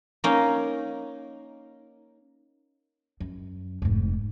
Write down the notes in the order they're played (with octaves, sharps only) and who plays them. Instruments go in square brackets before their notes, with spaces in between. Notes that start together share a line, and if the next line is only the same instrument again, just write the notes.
[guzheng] A#3 C#4 D#4
[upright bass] F#2
F1 G#2